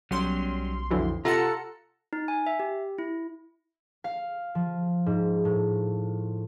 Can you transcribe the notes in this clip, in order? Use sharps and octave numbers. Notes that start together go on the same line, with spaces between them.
B1 F#3 G3 C#4 C6
F2 D3 E3 F#3
C3 F4 A4 F#5 A#5 C#7
D#4
G#5
E5
G4
E4
F5
F3
G#2
A2